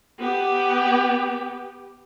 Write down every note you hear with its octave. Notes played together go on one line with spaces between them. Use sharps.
B3 G4